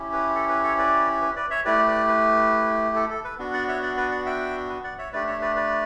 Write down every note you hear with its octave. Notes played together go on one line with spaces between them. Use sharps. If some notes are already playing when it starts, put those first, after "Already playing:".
Already playing: C#4 E4 G4
B4
A4
B4
A4 C#5
B4 D5
B4
B4 D5
C#5 E5
A3 E4 G4 B4 D5
B4 D5
B4
A4
A4
B4
B3 D4 F#4
D5 F#5
C#5 E5
D5 F#5
B4 D5
D5 F#5
E5 G5
B4
D5 F#5
C#5 E5
A3 D4 G4 B4 D5
C#5 E5
B4 D5
B4 D5